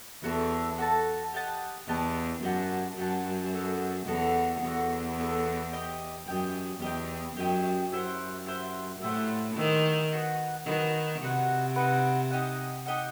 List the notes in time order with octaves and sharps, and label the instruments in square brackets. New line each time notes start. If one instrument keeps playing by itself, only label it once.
[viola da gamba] E2 [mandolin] F#4 A4 E5 A5
[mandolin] F#4 A4 E5 A5
G4 D#5 F#5 A5
[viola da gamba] E2 [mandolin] G4 D#5 F#5 A5
[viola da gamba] F#2 [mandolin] G4 D#5 F#5 A5
[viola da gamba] F#2 [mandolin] G4 D#5 F#5 A5
[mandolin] B3 F#4 A4
[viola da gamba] E2 [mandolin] B3 F#4 A4
[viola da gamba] E2 [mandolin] B3 F#4 A4
[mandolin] B3 F#4 A4
G4 D#5 G5
[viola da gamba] F#2 [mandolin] G4 D#5 G5
[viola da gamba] E2 [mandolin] G4 D#5 G5
[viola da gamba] F#2 [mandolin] G4 D#5 G5
[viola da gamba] F#2 [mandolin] E4 G4 C5 F#5
[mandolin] E4 G4 C5 F#5
[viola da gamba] A2 [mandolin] E4 G4 C5 F#5
[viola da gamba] D#3 [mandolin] E4 G4 C5 F#5
[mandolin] D#4 F#4 B4 F#5
[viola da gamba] D#3 [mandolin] D#4 F#4 B4 F#5
[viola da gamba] C3 [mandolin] D#4 F#4 B4 F#5
[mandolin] D#4 F#4 B4 F#5
D#4 G4 D#5 F#5
D#4 G4 D#5 F#5